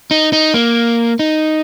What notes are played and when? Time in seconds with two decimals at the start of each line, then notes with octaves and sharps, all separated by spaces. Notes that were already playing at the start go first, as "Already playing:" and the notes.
0.11 D#4
0.33 D#4
0.54 A#3
1.19 D#4